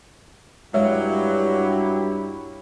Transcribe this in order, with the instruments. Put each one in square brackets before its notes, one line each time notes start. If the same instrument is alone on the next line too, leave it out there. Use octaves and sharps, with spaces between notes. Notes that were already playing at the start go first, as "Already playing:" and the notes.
[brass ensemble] G2 E4 G4 [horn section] F#3 [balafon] G#3 [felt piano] C#5 F5